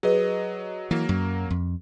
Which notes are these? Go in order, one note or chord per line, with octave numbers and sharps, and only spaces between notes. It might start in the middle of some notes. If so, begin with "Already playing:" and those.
F#3 G#4 B4 D#5
E3 F#3 A#3 A#4
F#2
F2